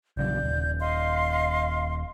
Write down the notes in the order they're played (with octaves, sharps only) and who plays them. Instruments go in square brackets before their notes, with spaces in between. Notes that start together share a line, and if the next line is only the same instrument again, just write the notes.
[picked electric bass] A#1 C#3 F#3 [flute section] D5 G6
[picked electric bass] D#1
[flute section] D#5 F5 C6